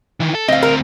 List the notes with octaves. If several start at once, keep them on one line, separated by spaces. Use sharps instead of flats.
D#3 E3
A4
D2 C4 D#5 F5
A#4